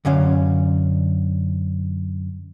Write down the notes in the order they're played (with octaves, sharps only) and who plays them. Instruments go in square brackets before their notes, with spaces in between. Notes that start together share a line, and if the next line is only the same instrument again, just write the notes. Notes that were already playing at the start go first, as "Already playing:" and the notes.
[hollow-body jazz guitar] F#2 D3 C#4 F5